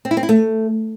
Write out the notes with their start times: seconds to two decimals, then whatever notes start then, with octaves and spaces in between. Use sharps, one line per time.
0.05 C4
0.11 E4
0.17 C4
0.23 E4
0.29 A3